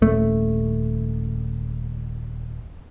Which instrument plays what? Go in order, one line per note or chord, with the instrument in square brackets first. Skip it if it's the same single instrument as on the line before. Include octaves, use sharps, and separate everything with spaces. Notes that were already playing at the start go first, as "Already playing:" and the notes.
[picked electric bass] D#1 A3